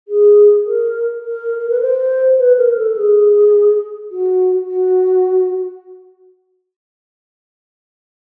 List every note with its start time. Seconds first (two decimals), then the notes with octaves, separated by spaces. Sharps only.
0.08 G#4
0.66 A#4
1.24 A#4
1.59 A#4
1.70 B4
1.81 C5
2.39 B4
2.58 A#4
2.77 A4
2.96 G#4
4.11 F#4
4.68 F#4